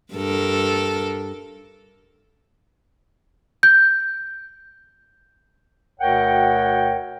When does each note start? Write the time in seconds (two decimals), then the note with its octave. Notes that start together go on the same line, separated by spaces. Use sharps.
0.14 G2 A4 A#4
3.63 G6
6.00 D2 B2 A#4 C#5 F#5 G5